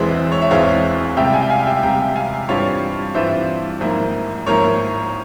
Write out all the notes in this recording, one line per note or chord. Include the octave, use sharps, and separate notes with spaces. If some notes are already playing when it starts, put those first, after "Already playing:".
Already playing: E1 E2 E3 G#3 C4 C5 E5
C#5
E5
E1 E2 E3 G#3 C4 C#5 F5
C#2 C3 G3 E5 G5
F5 G#5
G5
F5 G#5
E5 G5
C#2 C3 G3 G5 A#5
F5 G#5
G2 E3 G3 C4 F4 C#5 F5
G2 E3 G3 C4 F4 C5 E5
G#1 G#2 F3 A#3 E4
G#1 G#2 F3 A#3 E4 A#4 C#5